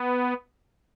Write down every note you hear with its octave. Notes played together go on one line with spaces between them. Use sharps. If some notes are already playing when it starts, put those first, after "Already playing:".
Already playing: B3